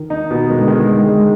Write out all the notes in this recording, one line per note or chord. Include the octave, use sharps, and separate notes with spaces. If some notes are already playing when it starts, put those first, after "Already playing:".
Already playing: D#3
D#4
B2
D#3 G#3
D3
D#3 G#3
G#3
G#3